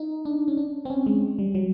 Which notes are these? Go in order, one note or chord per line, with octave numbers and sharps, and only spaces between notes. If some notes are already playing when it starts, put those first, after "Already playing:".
Already playing: D#4
D4
C#4
D4
C4
C#4
G#3
G3
F#3